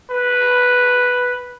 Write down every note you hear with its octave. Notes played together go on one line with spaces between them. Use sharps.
B4